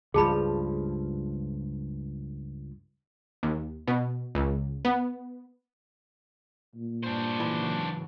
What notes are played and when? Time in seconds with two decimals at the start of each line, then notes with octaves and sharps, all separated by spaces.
0.14 C#2 G2 F3 G#4 A5 B5
3.43 D#2
3.88 B2
4.35 C#2
4.85 B3
6.75 A#2
7.04 G2 D4 C5
7.40 G#1 C#3 E3 F#3